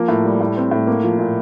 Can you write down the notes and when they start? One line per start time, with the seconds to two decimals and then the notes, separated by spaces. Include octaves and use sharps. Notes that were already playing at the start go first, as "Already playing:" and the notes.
Already playing: F3 A#3
0.08 A2
0.25 G3
0.41 A2
0.57 C4
0.71 A2
0.87 A#3
1.04 F3
1.19 A#2